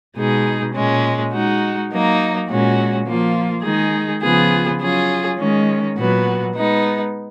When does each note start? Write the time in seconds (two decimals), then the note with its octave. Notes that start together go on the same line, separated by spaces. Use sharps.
0.17 B2 G#3 D#4 G#4
0.74 A#2 G#3 C#4
1.32 G#3 D#4 F#4
1.91 F#3 A#3 D#4
2.48 A#2 G#3 C#4 F#4
3.06 F3 A#3 F4
3.64 D#3 G#3 D#4 G#4
4.22 C#3 F3 B3 F4 G#4
4.80 F#3 C#4 F4 G#4
5.38 D#3 G#3 C#4
5.96 A#2 F#3 B3 F#4
6.54 G#3 B3 D#4